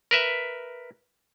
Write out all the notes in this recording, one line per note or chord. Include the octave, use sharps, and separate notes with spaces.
A#4 B4 E5